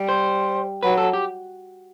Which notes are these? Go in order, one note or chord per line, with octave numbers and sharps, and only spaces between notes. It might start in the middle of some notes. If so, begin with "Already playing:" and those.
Already playing: G3
C5
F#3 B4
A4
G4